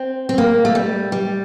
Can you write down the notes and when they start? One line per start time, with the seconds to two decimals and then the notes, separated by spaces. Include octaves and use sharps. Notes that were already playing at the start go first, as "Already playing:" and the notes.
Already playing: C4
0.29 C4
0.38 A#3
0.65 A3
0.75 G3
1.12 G3